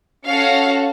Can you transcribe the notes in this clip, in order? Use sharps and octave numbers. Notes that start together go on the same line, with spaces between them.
C#4 F#4 A4 F5